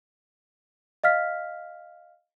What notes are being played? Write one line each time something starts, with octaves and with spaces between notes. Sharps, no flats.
D#5 F5 F6 B6